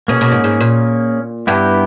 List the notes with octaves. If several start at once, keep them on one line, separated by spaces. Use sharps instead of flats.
B2 A#3 C#4 G#4
B2
G#2
G#2
A#2
G2 B3 E4 G4